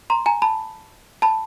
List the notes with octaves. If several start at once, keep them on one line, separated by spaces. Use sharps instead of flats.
A#5 C6
G#5 A#5
A5 B5
A5 B5